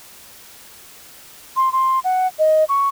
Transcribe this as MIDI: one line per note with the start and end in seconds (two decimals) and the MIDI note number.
1.56 1.72 84
1.73 1.99 84
2.04 2.27 78
2.39 2.64 75
2.69 2.89 85